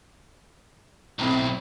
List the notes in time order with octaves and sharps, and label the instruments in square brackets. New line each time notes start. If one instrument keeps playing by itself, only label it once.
[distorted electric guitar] B1 [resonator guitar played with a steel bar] A2 C4 E4